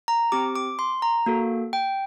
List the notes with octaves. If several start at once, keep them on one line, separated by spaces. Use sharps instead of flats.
A#5
C4 G4 D6
D6
C6
A#5
A#3 F#4 A4
G5